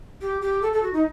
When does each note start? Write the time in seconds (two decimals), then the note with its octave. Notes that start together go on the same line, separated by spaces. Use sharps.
0.21 G4
0.42 G4
0.62 A4
0.73 A4
0.83 F#4
0.93 D#4